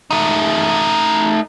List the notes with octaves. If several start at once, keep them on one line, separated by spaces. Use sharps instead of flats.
A3 D#4